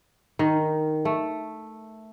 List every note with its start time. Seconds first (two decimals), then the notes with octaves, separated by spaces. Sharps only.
0.39 D#3
1.05 A3